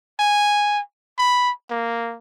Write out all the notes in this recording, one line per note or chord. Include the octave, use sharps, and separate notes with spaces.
G#5
B5
A#3